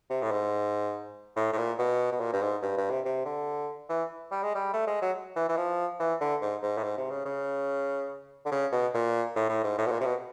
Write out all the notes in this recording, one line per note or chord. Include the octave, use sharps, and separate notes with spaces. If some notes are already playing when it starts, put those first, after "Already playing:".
C3
A2
G#2
A2
A2
A#2
B2
B2
A#2
G2
G#2
G2
G2
C3
C3
D3
E3
G3
G#3
G3
A3
G#3
F#3
E3
E3
F3
E3
D3
G#2
G#2
A2
G#2
C3
C#3
C#3
D3
C#3
B2
A#2
A2
A2
G#2
A2
B2
A#2
C3
B2